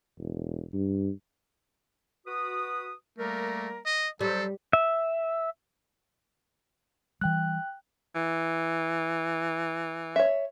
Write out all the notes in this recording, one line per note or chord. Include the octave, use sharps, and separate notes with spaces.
E1
G2
F#4 B4 D#6
G3 A3 A#3 A#4
D#5
F#3 G3 A4 C5
E5
E3 G3 G5 F#6
E3
C#5 E5